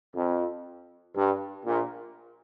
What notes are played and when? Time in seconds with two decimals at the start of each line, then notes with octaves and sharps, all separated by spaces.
0.16 F2
1.16 G2
1.65 A#1 A#2